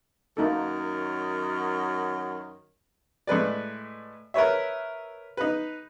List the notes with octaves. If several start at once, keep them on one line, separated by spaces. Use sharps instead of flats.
F#2 D#3 F#3 A#3 D#4 A4
A2 G#3 B4 D5
A#4 B4 C#5 E5
D#4 B4